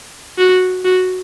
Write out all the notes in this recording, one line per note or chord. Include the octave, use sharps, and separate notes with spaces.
F#4
F#4